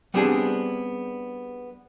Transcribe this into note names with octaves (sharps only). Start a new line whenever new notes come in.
G3 B3 C4 D4 G4 G#4